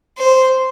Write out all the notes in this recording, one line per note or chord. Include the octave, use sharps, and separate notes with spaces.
C5